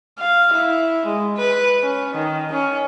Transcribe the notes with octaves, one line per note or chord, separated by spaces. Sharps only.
F5
E4
G#3
B4
C#4
D#3
C#4